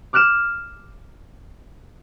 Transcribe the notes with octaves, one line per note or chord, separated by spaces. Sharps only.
D6 F6 F#6 D7 E7